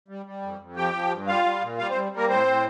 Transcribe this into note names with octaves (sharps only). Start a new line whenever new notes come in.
G3
G3
F2
F2
F3 G4 G5
F3
G2
G3 F4 F5
G3
A#2
G3 F4 F5
G3 C4 C5
G3 A#3 A#4
A2 C4 C5
A2